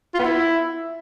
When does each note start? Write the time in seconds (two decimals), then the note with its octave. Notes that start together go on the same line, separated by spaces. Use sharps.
0.14 F4
0.19 B3
0.24 E4